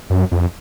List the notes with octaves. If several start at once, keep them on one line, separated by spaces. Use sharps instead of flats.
F#2
F2